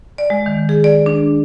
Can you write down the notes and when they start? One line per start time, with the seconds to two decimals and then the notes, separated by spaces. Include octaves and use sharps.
0.18 D5
0.30 G#3
0.46 D#3
0.69 G#4
0.84 D5
1.06 D4